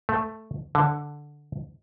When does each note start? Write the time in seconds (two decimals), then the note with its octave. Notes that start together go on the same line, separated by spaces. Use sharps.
0.09 A3
0.75 D3